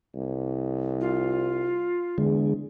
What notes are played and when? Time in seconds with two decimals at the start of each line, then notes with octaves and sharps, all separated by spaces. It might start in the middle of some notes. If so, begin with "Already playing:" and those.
0.15 C2
1.01 F4
2.18 E2 D3 G#3